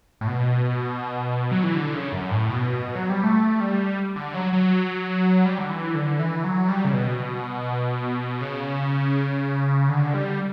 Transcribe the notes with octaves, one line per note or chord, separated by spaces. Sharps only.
A2
B2
F#3
E3
D3
C#3
F#2
A2
B2
F#3
G3
A3
G3
D3
F#3
F#3
G3
D3
E3
D3
E3
F#3
G3
C#3
B2
C#3
D3
G3